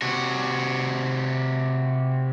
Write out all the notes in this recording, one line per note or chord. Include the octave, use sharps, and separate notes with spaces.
C3 F#4